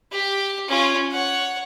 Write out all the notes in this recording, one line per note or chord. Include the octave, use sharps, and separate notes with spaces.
G4
C#4 F4
C#5 F#5